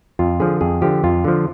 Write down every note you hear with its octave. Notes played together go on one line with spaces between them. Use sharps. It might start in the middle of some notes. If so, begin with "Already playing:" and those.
F2 F4
D3 F3 G#4
F2 G#4
D3 F3 G4
F2 F4
D3 F3